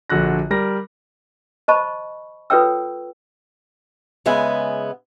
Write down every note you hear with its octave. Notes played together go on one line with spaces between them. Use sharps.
A#1 D3 F#4 F#6 A#6
G3 A#4 A#6
C5 D#5 A5 B5 C#6
F4 A4 B4 C#5 G5 E6
C#3 G#3 B3 E5 G#5